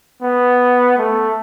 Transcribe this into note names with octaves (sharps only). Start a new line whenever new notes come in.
B3
A3